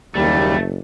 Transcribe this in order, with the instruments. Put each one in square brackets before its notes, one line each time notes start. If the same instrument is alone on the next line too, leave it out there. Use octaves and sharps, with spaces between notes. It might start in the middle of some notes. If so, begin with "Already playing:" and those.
[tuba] F#1 [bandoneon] D#2 G3 [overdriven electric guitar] A3